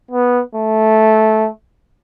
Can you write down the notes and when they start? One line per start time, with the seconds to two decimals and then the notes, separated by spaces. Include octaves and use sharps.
0.11 B3
0.55 A3